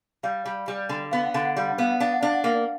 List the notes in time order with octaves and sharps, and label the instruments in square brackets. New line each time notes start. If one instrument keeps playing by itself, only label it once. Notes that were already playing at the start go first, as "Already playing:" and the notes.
[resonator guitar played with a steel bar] G3 [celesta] F5
[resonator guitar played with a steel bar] G3
G3
D3
[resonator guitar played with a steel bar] B3 [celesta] F5
[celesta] F#5
[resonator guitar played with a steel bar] D3 [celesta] F5
[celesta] F#5
[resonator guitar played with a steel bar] G3 [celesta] F5
[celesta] F#5
[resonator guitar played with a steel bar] B3 [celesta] F5
[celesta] F#5
[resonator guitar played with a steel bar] D4 [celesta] F5
[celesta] F#5
[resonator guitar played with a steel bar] D4 [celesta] F5
[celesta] F#5
[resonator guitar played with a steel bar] A#3 [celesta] F5